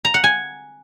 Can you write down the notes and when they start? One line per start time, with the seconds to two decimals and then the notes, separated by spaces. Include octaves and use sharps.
0.05 A#5
0.14 F#5
0.24 G#5